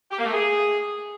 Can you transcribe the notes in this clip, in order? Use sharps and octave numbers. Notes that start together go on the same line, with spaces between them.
G4
A#3
A3
G#4